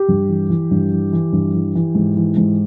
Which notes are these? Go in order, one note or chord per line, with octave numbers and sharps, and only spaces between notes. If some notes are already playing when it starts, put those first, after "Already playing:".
Already playing: G4
G2
E3
E3
G2
E3
E3
G2
E3
E3
G#2
E3
G#2